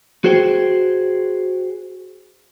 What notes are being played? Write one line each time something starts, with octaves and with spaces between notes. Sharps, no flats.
F#4 G#4 C5 G5